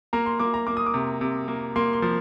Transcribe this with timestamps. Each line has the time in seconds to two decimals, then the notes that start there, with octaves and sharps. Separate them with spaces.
0.13 A#3 A#5
0.26 C6
0.40 A#3 D6
0.54 A#5
0.67 A#3 D6
0.77 D#6
0.86 D6
0.94 C3
1.21 C3
1.48 A#3
1.76 A#3 C6
1.93 C6
2.02 F3